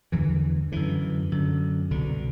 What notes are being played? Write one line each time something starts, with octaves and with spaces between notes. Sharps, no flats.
E2 D3 E3 G3
F#2 D3 E3
F#2 D3
C2 B2 D3